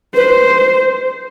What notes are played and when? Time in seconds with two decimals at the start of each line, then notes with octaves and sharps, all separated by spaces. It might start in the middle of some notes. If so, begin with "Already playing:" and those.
0.15 B4 C5